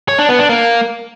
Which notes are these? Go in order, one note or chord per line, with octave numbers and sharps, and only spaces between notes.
C#5
D4
B3
D4
A#3